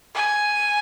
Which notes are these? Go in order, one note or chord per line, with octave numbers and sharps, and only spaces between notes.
G#5